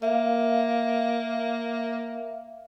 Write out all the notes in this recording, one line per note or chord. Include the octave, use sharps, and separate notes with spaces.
A#3 E5 F5